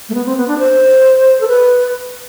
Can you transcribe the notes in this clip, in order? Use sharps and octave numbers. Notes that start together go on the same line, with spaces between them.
A3
B3
C4
B3
D4
C5
A4
B4